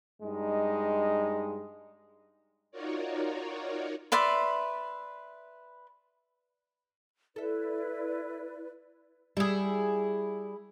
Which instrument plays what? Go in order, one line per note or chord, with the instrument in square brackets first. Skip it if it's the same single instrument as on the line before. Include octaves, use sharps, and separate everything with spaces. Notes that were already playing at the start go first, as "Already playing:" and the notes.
[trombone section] G2 G#3 D#4
[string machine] D#4 F4 F#4 A#4 C#5 D5
[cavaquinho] B4 D5 E5 C6
[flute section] E4 B4 D5 [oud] A4 E5
[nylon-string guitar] G3 [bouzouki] E4 G#4